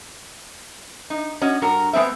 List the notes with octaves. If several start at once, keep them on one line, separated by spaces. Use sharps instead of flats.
D#4
C#4 F#4 D#5
G2 F#4 A#4
G#3 B3 C4 E5